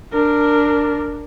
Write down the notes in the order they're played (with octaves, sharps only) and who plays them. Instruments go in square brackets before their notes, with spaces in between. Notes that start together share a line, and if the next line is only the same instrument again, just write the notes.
[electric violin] D4 A#4